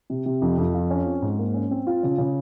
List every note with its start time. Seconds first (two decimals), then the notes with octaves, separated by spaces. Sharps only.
0.10 C3
0.26 C3
0.42 F2
0.58 F2
0.74 F4
0.90 C#4
1.06 C4
1.22 G#2
1.38 A#3
1.54 C#4
1.71 C4
1.87 F4
2.03 C#3
2.18 C#3